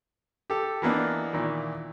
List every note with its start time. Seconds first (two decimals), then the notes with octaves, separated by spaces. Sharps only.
0.50 G4 A4
0.82 E3 A#3 B3 D4 D#4
1.33 A#2 D#3 E3